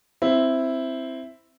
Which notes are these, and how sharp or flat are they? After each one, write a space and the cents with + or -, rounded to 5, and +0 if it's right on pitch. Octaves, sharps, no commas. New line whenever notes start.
C4 +0 E4 +0